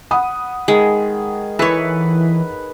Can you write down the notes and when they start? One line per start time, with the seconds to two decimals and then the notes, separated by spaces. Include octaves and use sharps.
0.11 F#5 B5 D#6
0.68 D#3 G#3 G#4
1.59 E3 A4 B4 C#5